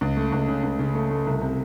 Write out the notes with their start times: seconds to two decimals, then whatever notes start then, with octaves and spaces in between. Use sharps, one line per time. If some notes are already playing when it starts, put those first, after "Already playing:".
0.01 C#2
0.17 A3
0.32 C#2
0.48 C#3
0.64 C#2
0.79 C#3
0.94 A3
1.10 A3
1.26 C2
1.41 C3